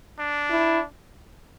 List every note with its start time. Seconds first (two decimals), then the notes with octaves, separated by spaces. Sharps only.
0.19 D4
0.50 E4